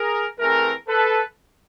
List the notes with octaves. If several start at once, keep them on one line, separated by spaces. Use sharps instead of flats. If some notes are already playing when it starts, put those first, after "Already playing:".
Already playing: G#4 A#4
E3 A3 C4 G#4 A#4
A4 B4